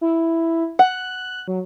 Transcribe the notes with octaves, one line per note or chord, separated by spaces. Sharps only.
E4
F#5 F#6
F#3